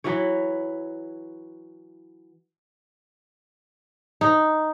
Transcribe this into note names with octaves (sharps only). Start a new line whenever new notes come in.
E3 F#3 E4 C#5
D#4